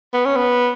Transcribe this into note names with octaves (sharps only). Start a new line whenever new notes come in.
B3
C#4
B3